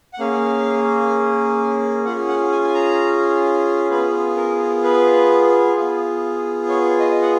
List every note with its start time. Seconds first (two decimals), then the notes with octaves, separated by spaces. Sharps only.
0.14 F#5
0.19 A#3 C#4 G#4 F5
2.05 C#4 F4 G#4 F#5
2.28 F#5
2.51 G#5
2.64 G#5
2.74 A#5
3.90 B3 F4 G#4 B4
4.36 A#4
4.84 B4
5.76 B3 F4 G#4
6.69 C#5
6.99 D#5
7.22 F#5